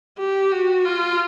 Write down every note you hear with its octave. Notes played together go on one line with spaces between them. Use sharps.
G4
F#4
F4